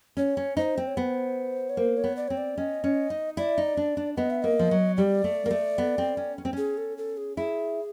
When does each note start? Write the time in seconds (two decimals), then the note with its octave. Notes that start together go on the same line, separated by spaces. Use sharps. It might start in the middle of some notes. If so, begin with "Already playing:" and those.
0.17 C#4 C#5
0.37 C#4
0.57 D#4 C5
0.77 C4
0.87 C#5
0.97 B3 C5
1.70 C#5
1.77 A#3 C5
1.97 C#5
2.04 B3
2.17 D5
2.28 C4 C#5
2.37 D5
2.57 C#4 D#5
2.84 C#4
3.10 D#4
3.37 E4 D5
3.58 D#4
3.77 D4
3.97 D4
4.17 B3 D#5
4.30 E5
4.42 A#3 D#5
4.59 F3
4.71 F#3
4.97 G3 D5
5.24 A3
5.46 A#3
5.51 A3
5.78 B3
5.98 C4
6.17 C#4
6.38 C#4
6.45 C4
6.53 C#4 G#4
6.78 A4
6.98 A4
7.17 G#4
7.37 E4 G#4